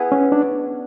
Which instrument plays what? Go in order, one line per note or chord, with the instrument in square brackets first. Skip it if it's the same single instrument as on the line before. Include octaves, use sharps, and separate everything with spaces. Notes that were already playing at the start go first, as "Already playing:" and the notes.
Already playing: [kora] B3 E4 G#4 B4
[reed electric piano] C#4
D4